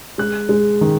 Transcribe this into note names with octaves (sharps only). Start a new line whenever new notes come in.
G#3 F#6
G#3
D#3